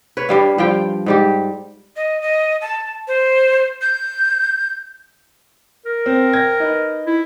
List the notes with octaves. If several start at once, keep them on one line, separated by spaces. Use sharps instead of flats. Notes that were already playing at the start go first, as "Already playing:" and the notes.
B4 C#5
G2 G3 F5
G2 F3 F4 G5
G#2 G3 G4
D#5
D#5
A5
C5
G6
A#4
C4
G5 G#6 A#6
D#4 B4
E4